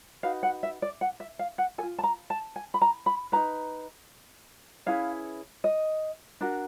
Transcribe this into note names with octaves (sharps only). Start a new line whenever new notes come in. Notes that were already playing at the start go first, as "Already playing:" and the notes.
D#4 F#4 B4 F5
F#5
E5
D5
F#5
E5
F5
F#5
A4 G#5
F4
A5
A#5
A5
G#5
B5
A#5
B5
D#4 G#4 B4 A#5
C#4 E4 G#4 B4 F5
D#5
D4 F#4 A#4